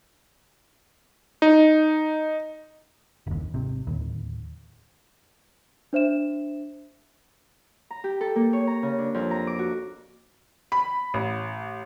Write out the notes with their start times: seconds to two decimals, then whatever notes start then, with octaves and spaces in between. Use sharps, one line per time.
1.42 D#4
3.27 F#1 D#2
3.54 G#1 C3
3.87 D1 D#2
5.93 D4 C5 E5 E7
7.91 A#5
8.04 G4
8.21 A4
8.36 A#3
8.53 C#5
8.67 A#5
8.83 C#3
8.99 D4
9.14 F2
9.31 A#5
9.47 D6
9.59 F#4
10.72 B5
11.14 A1